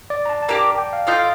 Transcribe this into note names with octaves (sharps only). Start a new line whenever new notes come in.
D5
A#5
A5
A5
A#3 D4 G4 A#5
G5
F5
F4 A4 D#5 F5 G5
F5